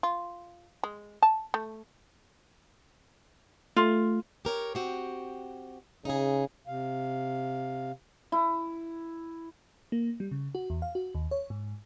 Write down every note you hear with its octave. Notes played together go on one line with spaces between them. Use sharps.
F4
G#3
A5
A3
A3 F4
G4 A#4 C#5
C4 F#4 G4
C#3 D#4 G#4
C3 F5
E4
A#3
G3
C#3
F#4
E2
F5
F#4
D#2
C#5
G#2